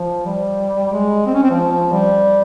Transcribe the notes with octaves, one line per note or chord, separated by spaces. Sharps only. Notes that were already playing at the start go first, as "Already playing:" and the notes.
Already playing: F3
G3
G#3
C4
C#4
C4
F3
G3